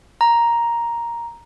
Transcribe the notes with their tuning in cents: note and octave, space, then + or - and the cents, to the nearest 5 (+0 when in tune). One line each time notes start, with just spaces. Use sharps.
A#5 +5